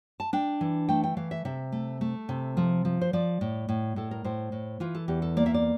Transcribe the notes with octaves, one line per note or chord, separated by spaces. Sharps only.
A5
D4 G5
E3
A3 G5
G5
E3 F5
E5
C3 E5
A3
A3
C3
F3
F3
C5
F3 D5
A2
A2
A2 A4
A#4
A2 C5
A2
E3 F4
A4
E2 G4
A4
A#3 D5
E5
D5